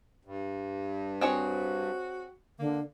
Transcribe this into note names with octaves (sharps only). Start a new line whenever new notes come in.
G2
C4 F#4 G#4 C#5
D3 A#3